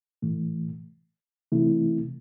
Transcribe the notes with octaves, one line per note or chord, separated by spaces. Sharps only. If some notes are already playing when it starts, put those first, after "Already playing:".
A2 E3 A3
C3 E3 A3 C4 E4